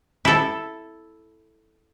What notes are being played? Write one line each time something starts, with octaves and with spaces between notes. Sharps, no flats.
E4 A4